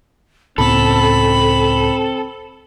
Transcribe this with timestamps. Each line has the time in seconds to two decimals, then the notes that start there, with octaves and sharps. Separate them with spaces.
0.58 C#2 A2 B3 C4 A4 B5